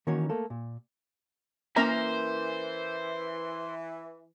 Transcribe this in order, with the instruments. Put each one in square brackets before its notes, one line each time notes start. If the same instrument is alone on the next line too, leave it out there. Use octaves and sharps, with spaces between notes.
[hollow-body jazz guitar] D#3 E3 A#3 C#4 F#4 C#5
A3 A#3 A4
A#2
[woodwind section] E3 [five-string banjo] A#3 C#4 E5 [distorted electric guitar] C5 [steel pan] A#5